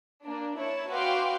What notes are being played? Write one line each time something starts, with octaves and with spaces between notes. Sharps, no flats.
A#3 D4
E4 C#5 A5
F#4 B4 F5 G5 C6 D6